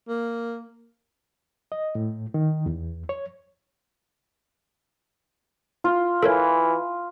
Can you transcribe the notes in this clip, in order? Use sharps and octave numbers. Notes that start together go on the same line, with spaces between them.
A#3
D#5
A2
D#3
E2
C#5
F4
E3 A4 A#4 C#5